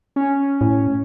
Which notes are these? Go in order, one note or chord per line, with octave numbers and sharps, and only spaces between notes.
C#4
A2